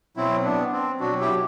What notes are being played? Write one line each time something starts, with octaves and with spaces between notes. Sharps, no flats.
B2 F#3 C4 E4
B3 D4
C4
B2 F#3 D4 F#4
E4 G4